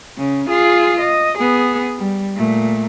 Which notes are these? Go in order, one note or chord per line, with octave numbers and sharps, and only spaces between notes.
C#3 C#4
F4 G#4
D#5
B3 G#4
G3
A#2 A3